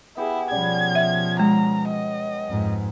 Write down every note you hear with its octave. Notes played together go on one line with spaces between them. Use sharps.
B3 E4 G4 G#4
B2 F3 G3 C#4 F#5 G#6
E5
G#3 A#5
D#5
F2 G#2